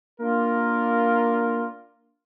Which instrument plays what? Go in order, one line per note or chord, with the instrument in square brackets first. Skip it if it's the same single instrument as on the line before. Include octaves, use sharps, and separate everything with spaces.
[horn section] A#3 D4 F4 A#4